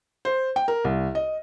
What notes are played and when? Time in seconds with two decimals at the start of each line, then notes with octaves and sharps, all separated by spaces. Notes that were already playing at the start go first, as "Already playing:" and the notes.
0.25 C5
0.56 G5
0.68 A#4
0.84 C2
1.15 D#5